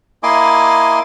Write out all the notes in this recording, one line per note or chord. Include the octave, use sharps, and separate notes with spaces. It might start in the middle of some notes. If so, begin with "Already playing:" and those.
A#3 E4 D#5 G#5 C6 D6